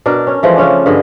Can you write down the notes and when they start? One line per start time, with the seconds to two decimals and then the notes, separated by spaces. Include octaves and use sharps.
0.06 B2 D4 A#4
0.27 C#4
0.43 E3 F3 G#3 A3
0.56 C#3 C#4 D4
0.86 G2 D3 G#4 D#5